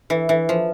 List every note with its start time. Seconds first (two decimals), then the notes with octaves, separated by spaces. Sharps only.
0.10 E3
0.29 E3
0.49 F3